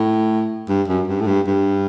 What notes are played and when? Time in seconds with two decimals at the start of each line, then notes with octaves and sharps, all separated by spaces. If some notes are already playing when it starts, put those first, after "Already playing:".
Already playing: A2
0.69 G2
0.88 F#2
1.08 G2
1.21 A2
1.27 G2
1.47 G2